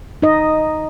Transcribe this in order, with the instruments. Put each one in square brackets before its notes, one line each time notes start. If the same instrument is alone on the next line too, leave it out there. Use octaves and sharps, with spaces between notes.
[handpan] D#4 D#5